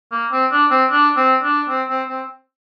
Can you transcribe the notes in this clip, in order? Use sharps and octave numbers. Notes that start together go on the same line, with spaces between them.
A#3
C4
D4
C4
D4
C4
D4
C4
C4
C4